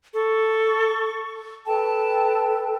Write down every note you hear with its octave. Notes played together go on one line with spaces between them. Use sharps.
A4 C#6
A4 B4 G5 A5